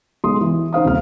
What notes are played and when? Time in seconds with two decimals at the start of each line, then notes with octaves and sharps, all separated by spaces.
0.24 B1 B2 G#3 A4 C6 D#6
0.41 E3
0.73 D#4 C5 F5 D#6
0.85 D#1 C2 F6